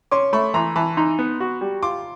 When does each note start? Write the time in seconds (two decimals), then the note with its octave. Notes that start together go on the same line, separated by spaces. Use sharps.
0.11 C#4 C6 D6
0.33 A3 B5 C#6
0.54 E3 A#5 C6
0.76 E3 A5 B5
0.97 D#4 A#5 C6
1.19 B3
1.40 F#4
1.61 G3
1.83 F4 C6 D6